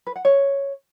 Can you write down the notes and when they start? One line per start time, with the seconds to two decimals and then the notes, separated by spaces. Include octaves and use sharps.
0.07 B4
0.16 F#5
0.25 C#5